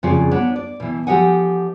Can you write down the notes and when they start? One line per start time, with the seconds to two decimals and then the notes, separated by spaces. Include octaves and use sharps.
0.03 F2 C#3 F4 G#4 D5
0.31 B3 D4 C#5 D5
0.56 D5
0.80 B2 E3
1.07 F3 G4 A4 D#5 F#5 G#5